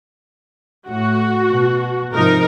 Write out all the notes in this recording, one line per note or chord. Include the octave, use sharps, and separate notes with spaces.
A2 F#4
B2
G#2 C3 F3 D#4 A#4